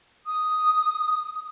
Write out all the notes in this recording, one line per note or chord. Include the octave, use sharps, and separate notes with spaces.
D#6